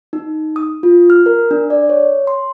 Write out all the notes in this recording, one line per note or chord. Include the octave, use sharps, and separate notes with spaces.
D#4
D#6
F4
F6
A#4
D4
D5
C#5
C6